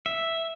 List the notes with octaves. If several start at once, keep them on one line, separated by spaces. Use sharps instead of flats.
E5